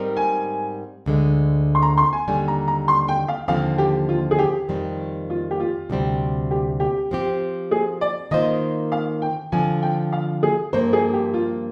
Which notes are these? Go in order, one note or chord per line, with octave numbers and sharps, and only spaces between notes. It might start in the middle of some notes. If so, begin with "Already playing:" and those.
Already playing: G#2 G3 C4 D#4 A#4
G#5
D2 D3 G#3
C6
A#5
C6
G#5
D#2 D3 G3 G#5
A#5
A#5
C6
G5
F5
D#2 D3 F3 C4 F5
G4
F4
G#4
G4
F2 D#3 G3 C4
F4
G4
F4
D2 C3 G3 C4
G4
G4
F3 C4 G4
G#4
D5
D#3 A#3 F4 C5 D#5
F5
G5
D3 F3 C4 G#5
G5
F5
G#4
G2 F3 A#3 C5
G#4
G4
F4